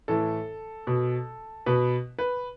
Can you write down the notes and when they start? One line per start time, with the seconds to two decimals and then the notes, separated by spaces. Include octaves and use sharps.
0.08 A2 E3 A4
0.87 B2
1.66 B2 B4
2.19 B4